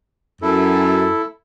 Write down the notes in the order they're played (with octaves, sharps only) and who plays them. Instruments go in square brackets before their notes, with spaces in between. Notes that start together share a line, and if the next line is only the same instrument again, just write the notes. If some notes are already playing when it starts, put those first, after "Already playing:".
[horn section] F#2 [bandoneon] E4 A4